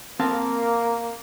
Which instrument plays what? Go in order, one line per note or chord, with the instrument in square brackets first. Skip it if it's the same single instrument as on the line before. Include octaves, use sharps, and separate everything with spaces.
[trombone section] A#3 [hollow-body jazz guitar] C4 F5 A5